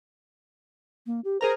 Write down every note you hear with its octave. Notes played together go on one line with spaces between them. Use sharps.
A#3
G4
G#4 A#4 C5 A#5